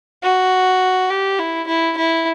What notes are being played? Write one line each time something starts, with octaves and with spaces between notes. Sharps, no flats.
F#4
G4
E4
E4
E4